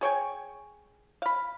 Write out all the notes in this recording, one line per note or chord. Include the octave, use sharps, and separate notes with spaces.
G#4 C#5 G5 G#5
F5 B5